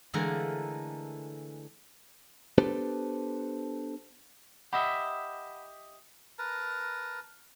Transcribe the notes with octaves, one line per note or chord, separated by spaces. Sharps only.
D3 E3 G#3 A3 A#4 F5
B3 D4 G4 A4 B4 C5
G4 D#5 E5 F#5 B5
A#4 B4 A5 A#5